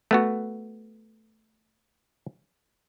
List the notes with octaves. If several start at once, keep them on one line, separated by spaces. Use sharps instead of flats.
A3 B3 F#4